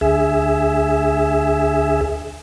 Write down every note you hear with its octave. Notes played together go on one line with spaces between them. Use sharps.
D2 G#4 E5